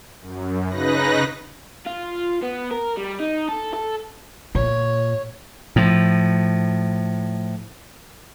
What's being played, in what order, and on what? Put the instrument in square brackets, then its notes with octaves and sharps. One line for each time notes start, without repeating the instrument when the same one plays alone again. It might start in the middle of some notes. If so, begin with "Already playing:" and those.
[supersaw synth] F#2
C#3 D#4 B4 F#6 A#6
[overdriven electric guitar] F4
B3
A#4
G3
D#4
A4
A4
[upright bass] A#2 [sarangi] C#5
[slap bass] A2 F3